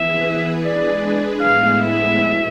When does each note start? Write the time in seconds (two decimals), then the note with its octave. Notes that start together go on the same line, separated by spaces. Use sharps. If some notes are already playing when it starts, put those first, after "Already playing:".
Already playing: E3 B3 E4 G#4 B4 E5
0.64 G#3 D4 G#4 B4 D5
1.41 A2 G#3 B3 E4 F5
1.81 E5
2.19 B2